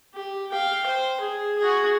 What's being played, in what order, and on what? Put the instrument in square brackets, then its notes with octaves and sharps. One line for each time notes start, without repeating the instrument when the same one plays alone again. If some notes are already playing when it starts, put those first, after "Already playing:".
[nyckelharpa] G4
F5 G5
C5
G#4
F#4 G#4